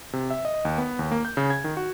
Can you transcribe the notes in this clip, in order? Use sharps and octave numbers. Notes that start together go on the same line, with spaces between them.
C3
E5
D#5
D#2
B3
D#2
A#3
G6
C#3
G#6
D#3
F#4